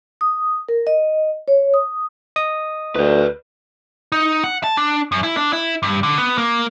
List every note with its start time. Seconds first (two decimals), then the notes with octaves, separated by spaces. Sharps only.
0.21 D#6
0.69 A#4
0.87 D#5
1.48 C#5
1.74 D#6
2.36 D#5 D#6
2.96 D2 B4 D5
4.12 D#4
4.44 F#5
4.64 A5
4.77 D4
5.12 F#2
5.24 E4
5.37 D4
5.53 E4
5.83 G2
6.03 D3
6.18 B3
6.38 A#3